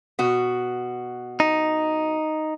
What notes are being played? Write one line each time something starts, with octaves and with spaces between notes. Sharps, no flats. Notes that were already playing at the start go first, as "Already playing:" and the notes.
B2 F#4
D#4